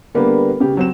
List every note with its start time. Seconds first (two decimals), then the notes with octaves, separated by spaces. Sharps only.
0.14 D3 G3 A#3 B3 G4 B4
0.60 C#3 G4
0.77 F#3 C4 E7